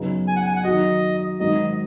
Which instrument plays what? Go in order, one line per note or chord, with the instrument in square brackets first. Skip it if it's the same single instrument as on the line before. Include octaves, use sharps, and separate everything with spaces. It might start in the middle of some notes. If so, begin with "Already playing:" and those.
Already playing: [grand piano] F#2 C#3 B3 D#4
[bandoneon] G#5
F#5
G#5
F#5
[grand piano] D#3 F#3 D#4 F#4 [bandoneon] D#5
[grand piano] G#2 D#3 F#3 D#4 F#4 [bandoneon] D#5